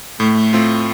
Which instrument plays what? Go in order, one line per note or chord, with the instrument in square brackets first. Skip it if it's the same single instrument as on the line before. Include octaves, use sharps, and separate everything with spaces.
[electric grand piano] A2 [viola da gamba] A3
[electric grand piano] A3 C4 F4